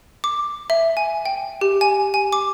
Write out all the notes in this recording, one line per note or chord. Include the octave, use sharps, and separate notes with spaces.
D6
E5
G#5
G5
G4
G#5
G#5
D6